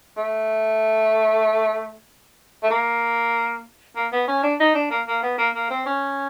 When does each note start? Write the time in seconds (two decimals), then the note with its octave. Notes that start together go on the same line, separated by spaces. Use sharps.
0.17 A3
2.63 A3
2.71 A#3
3.96 A#3
4.12 B3
4.28 C#4
4.43 D4
4.60 D#4
4.75 D4
4.91 A#3
5.07 A#3
5.23 B3
5.38 A#3
5.54 A#3
5.71 C4
5.86 C#4